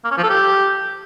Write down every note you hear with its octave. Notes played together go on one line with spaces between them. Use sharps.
A#3
C#4
F3
A4
G4